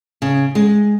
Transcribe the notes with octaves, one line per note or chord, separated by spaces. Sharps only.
C#3
G#3